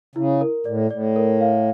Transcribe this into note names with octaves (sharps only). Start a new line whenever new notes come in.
C#3 E4
A#4
A2 D5
A2 D5
A#4
F5